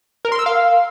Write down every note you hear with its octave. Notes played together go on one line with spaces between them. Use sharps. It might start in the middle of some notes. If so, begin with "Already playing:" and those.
A#4
C6
E6
F5